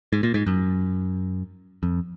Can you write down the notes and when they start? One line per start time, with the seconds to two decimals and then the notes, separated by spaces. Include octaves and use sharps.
0.13 G#2
0.23 A#2
0.34 G#2
0.46 F#2
1.83 F2